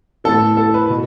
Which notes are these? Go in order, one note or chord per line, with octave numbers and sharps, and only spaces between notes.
A2 E3 A4
A4
B4
B2